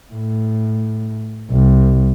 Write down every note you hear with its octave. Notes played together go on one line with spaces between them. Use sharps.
A2
C2